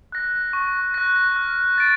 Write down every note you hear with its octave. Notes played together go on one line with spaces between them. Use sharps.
F#6 A#6
C#6
F#6 A#6
F6
A6 D7